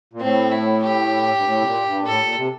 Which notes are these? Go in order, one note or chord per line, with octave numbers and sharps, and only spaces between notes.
A#2
A2 C4
E4
G4
G2
A2
C3
A#2
G2
A#2
A2 A4
A#2
C3